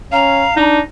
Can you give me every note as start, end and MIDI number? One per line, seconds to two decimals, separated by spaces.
0.13 0.47 61
0.13 0.55 77
0.13 0.65 82
0.57 0.81 62
0.57 0.80 63